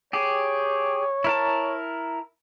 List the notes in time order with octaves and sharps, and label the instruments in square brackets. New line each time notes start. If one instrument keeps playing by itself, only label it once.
[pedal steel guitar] G4 G#4 [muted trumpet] C#5
[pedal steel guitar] E4 A#4 A5